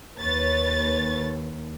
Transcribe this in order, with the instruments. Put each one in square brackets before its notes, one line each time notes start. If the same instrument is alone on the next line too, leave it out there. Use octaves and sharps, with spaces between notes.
[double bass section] D#2 [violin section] B4 C#5 A6